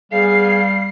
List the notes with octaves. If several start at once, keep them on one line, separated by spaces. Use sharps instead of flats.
G3 B3 G#4 F5 C7